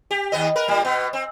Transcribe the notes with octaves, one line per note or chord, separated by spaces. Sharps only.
G4
D#2 B3 D#5
A#4 B4
A2 G3 A#3
B2 B3
C4